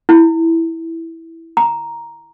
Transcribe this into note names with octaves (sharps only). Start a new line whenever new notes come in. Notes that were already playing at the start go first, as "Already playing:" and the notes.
E4
A#5